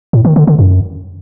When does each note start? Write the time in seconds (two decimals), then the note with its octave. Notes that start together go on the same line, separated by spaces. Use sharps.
0.13 A2
0.25 D#3
0.36 D3
0.47 D3
0.59 F#2